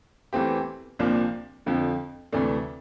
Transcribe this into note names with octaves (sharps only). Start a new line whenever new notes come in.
E2 E3 A3 C4 G4
C2 A#2 F3 A#3 D4
F2 D3 F3
D2 C3 E3 A3 D4